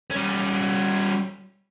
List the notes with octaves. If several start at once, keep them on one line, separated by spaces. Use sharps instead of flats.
G3 C#4